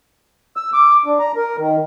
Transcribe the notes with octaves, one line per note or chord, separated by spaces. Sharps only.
E6
D6
D4
A#5
A#4
D#3